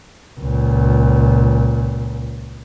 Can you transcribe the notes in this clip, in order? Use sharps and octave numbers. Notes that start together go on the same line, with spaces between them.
C#2 A#2